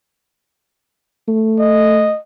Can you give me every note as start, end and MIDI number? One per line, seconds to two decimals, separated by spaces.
1.28 2.11 57
1.59 2.18 75